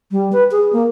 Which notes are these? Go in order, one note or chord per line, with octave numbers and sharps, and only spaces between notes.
G3
B4
G#4
A#3